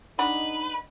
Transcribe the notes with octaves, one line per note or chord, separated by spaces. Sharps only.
G#3 D4 D#4 B4 F#5 B5